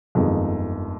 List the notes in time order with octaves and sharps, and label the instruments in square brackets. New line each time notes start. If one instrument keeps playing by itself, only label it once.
[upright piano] G1 F2 D#3 G#3 D#4